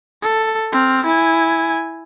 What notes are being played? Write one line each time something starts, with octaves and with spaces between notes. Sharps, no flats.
A4
C4 F6
E4 G#5